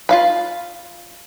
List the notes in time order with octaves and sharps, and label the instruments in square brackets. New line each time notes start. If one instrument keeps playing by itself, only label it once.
[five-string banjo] F4 F5 B5